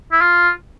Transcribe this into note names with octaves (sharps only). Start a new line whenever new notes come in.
E4
F4